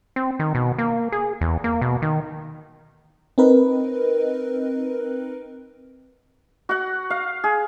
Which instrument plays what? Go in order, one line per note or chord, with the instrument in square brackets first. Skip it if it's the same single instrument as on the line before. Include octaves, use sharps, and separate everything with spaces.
[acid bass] C4
D#3
B2
A#3
G#4
E2
A#3
B2
D#3
[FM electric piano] C4 D#4 A#4 B4 D#5
[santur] F#4 F#5
F5
G#4